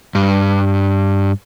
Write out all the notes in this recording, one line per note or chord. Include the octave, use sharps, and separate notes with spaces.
G2